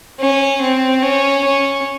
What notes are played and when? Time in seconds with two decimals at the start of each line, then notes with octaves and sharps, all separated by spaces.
0.20 C#4
0.62 C4
1.03 C#4
1.44 C#4